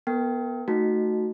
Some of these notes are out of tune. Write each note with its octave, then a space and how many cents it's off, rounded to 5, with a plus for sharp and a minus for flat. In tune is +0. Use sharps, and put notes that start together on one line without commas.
B3 -15 A#4 -45 G5 +0
A3 +0 D#4 +0 F#4 +0